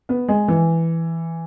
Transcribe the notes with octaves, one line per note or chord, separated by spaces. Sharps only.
B3
G#3
E3